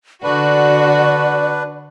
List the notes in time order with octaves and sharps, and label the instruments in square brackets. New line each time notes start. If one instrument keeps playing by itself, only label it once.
[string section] D3 F#4 [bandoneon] D4 B4 [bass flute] D5